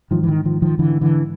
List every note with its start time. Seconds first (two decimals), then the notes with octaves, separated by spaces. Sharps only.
0.11 G#2 D#3 F3
0.24 E3
0.28 D#3
0.45 D#3 F3
0.62 D#3 F3
0.79 D3 E3
1.01 D3 E3